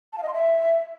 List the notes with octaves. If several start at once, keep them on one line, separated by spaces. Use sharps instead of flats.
A5
F5
D#5
C6
E5